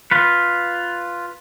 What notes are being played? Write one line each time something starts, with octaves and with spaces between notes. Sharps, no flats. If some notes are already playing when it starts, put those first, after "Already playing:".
F4 B4